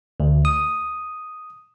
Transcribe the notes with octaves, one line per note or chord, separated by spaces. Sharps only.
D2
D#6